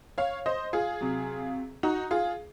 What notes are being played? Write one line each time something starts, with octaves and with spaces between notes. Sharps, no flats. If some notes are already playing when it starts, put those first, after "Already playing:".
C#5 F5
C5 D#5
F4 G#4
C3 F#3
D#4 F#4
F4 G#4